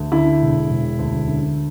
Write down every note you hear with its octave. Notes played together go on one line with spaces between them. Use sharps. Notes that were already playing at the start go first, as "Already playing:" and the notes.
Already playing: D2
D3 E4
E1
E1
D2
D3